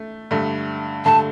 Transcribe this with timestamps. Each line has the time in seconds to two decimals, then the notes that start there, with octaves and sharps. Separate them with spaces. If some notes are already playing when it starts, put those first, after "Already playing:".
Already playing: A3
0.31 G2 D3 A3
1.05 G2 D3 A3 A5